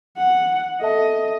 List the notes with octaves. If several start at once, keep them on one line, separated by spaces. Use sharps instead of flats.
F#5
A4 D#5 E5 A5